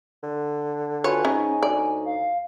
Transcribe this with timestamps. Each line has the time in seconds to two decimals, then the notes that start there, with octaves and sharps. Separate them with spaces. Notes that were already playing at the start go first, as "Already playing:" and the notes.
0.23 D3
1.04 F4 F#4 B4 C#5 G#5
1.25 G#2 C#4 D#4 C#5
1.63 D2 D5
2.05 F5